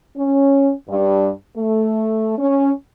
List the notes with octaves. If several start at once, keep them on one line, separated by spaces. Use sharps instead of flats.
C#4
G2
A3
C#4